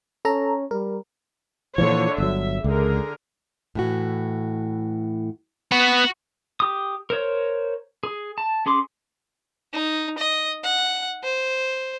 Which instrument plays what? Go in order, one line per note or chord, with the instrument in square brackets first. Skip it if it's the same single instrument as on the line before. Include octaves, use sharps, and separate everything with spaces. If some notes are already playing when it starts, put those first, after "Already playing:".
[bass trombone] C#4 [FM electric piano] A4 A#5
[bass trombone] G3 [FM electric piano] A#4
[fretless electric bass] A#2 E3 F3 [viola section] D3 C#5
[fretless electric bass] G1 F#3 [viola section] E5
[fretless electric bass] C#2 [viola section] D3 G#4 A#4
[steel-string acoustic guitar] A2 E3 F#4
[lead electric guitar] B3 [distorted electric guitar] F#4
[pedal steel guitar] G4 D#6
A#4 C5 C#5
G#4
A5
C#4 G#4 C6 D6
[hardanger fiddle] D#4
D#5
F#5
C5